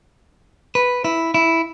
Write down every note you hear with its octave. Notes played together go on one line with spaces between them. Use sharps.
B4
E4
E4